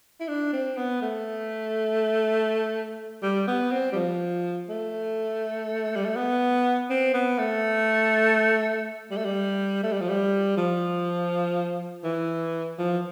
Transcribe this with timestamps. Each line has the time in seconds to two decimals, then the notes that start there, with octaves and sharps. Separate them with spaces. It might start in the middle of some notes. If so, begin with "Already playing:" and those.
0.20 E4
0.28 D4
0.53 C4
0.77 B3
1.01 A3
3.22 G3
3.47 B3
3.71 C4
3.92 G3
3.95 F3
4.69 A3
5.96 G3
6.05 A3
6.16 B3
6.90 C4
7.14 B3
7.39 A3
9.11 G3
9.17 A3
9.25 G3
9.83 A3
9.93 G3
10.01 F3
10.09 G3
10.57 F3
12.04 E3
12.78 F3